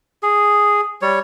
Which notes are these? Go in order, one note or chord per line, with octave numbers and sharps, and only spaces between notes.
G#4
G3 C#5